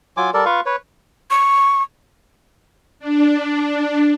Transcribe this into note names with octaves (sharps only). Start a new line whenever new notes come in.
F#3 F4 G#5 D6
G3 A4 A#4 D5
F4 B4 F5 C#6
B4 C#5
C#6
D4